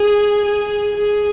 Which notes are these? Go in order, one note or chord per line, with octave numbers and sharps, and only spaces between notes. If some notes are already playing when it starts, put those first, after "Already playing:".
Already playing: G#4
G#4
G#4